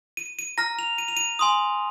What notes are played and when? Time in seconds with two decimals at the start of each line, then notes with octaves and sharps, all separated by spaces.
0.17 D#7
0.39 D#7
0.58 A#5 F6 A#6
0.79 F7
0.98 D#7
1.08 F7
1.17 D#7
1.39 G#5 C6 D#6